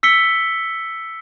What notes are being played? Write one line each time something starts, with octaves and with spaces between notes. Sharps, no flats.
E6 B6 C#7 G7